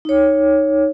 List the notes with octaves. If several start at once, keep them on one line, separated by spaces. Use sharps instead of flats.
D#4 C#5